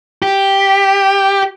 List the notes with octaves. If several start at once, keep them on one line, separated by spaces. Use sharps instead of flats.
G4